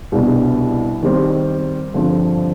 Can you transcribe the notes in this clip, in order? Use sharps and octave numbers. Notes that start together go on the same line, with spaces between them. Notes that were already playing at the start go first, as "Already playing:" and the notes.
C2 B2 G3 B3 D4
D#3 G3 C4
G2 D3 F3 C4